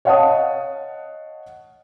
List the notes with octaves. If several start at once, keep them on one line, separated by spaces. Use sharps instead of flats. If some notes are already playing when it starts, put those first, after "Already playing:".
C#5 D#5 F5 F#5 A5 D#6